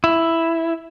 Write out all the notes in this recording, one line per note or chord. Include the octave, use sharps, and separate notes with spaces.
E4